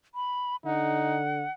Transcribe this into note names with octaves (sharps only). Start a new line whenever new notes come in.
B5
D3 D#4 F#5